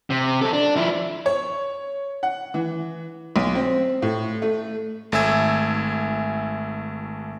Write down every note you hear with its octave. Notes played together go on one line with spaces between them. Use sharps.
C3
F#3 A4
D4
F3 E4
C#5
F#5
E3
B1
C4
A2
A3
G#1 A3 E5 G#5 E6 G#6